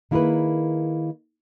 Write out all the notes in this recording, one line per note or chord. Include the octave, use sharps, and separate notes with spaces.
D#3 A#3 E4 G#4 A#4 B4